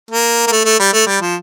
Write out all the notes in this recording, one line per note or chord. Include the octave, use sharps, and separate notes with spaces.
A#3
A#3
A3
A3
G3
A3
G3
F3